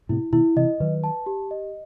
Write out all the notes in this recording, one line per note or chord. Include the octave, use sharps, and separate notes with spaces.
A2 C3 E4
B2 D#3 E4
C3 E3 D#5
D#3 F#3 B4
A5
G4
D#5